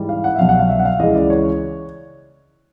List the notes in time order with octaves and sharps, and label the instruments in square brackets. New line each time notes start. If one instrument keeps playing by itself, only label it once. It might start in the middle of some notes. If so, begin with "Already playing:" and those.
Already playing: [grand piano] G#2 E3 G3
F5
F#5
E5
C2 B2 F#3 F5
F#5
F5
E5
F#5
F5
C#2 C#3 E3 D#5
D5
C#5